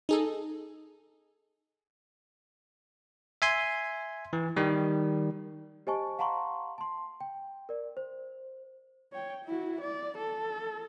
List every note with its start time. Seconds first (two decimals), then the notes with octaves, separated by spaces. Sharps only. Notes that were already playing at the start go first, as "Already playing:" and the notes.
0.09 D#4 G#4 A4
3.42 E5 G#5 C6
4.33 E3
4.57 D#3 G3
5.87 G4 C5 D#5 G#5 A5 C#6
6.19 F5 F#5 A5 A#5 C6 C#6
6.78 A5 C6
7.21 G5
7.69 A#4 D5
7.97 C5
9.12 C#5 G5
9.45 E4 F#4
9.81 D5
10.18 A4